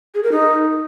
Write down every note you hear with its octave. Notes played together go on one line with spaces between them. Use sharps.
G#4
A#4
D#4